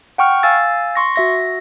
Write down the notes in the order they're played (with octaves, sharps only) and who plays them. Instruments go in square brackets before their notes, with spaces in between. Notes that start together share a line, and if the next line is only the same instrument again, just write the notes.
[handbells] F#5 G5 C#6 F6
F5 G#5 E6 A6
C6 C#6 A#6
F#4 E5 A#6